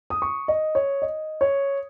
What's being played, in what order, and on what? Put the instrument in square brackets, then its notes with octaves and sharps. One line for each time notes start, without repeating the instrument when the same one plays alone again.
[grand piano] D#6
C#6
D#5
C#5
D#5
C#5